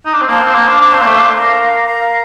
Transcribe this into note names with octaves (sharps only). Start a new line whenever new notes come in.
D#4
D4
C4
A#3 C5 F5 A5 C6
C4
A#3
D4
D4 C5 F5 A5 C6
C4
A#3
A3
D4
A#4 F5 A#5
A#4 F5 A#5